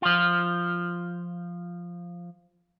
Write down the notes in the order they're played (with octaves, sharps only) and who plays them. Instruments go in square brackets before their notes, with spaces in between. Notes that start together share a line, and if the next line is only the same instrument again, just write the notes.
[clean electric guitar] F3 F4